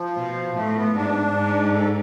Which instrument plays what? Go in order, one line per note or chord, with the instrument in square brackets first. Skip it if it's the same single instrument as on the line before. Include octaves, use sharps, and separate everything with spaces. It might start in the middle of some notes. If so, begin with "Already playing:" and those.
Already playing: [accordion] F3
[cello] B2
[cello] A2 [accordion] A3
[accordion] B3
[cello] G#2 [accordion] D4
[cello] G#2
[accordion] A4